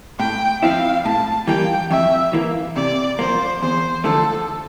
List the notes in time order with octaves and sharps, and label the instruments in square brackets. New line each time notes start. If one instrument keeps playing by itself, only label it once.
[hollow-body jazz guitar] A2 [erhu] G5
[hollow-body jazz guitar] F3 C4 E4 [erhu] F5
[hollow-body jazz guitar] A2 [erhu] A5
[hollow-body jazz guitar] E3 G3 A#3 [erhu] G5
[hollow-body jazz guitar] F2 [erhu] E5
[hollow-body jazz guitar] E3 A#3
[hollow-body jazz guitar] C3 [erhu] D5
[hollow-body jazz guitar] F3 A#3 [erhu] C5
[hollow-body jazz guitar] E2 [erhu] C5
[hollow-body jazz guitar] D3 F3 A3 [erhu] A4